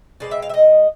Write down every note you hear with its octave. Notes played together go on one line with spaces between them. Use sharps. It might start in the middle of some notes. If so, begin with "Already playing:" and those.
B2 G#3 C4 D5
E5
F5
E5
D#5